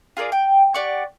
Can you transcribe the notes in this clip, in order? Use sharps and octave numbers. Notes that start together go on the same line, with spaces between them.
F4 G#4 A#4 D5
G5
G4 D5 F#5 C#6